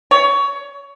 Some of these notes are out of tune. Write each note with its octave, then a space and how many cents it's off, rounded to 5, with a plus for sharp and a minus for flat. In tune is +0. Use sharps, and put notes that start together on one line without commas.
C#5 +20